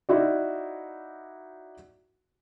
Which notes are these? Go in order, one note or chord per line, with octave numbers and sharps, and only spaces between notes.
D#4 E4 F#4 D5